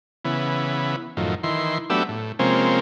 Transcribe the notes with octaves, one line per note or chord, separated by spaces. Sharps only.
C#3 E3 B3
F#2 A2 D#3 F3
D#3 E3 C6
F#3 A3 B3 D4 G4 E5
A2
C3 F3 G#3 A#3 C4 C#4